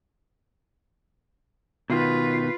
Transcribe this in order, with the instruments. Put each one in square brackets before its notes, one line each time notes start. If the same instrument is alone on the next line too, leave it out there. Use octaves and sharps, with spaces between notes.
[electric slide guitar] B2 D#3 [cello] F4 B4